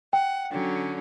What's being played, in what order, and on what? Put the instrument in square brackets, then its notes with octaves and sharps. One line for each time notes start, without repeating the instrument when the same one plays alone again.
[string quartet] F#5 [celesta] G5
[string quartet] D3 F#3 C#4